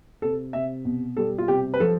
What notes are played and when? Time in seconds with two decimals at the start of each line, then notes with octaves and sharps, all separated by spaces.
0.22 C3 A4
0.53 C3 E5
0.85 B2
1.17 G3 A4
1.38 F4
1.48 C3 G4
1.74 B4
1.80 F3 A4